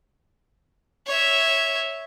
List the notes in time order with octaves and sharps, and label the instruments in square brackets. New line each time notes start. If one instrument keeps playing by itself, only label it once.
[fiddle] C#5 E5